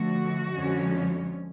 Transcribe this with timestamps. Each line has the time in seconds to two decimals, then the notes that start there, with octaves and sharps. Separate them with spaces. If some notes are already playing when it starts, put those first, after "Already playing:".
Already playing: D3 F3 A3 F#4
0.55 F2 D3 F3 G#3 C#4